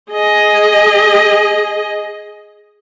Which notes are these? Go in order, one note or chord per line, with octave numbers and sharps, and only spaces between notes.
G#4 D#5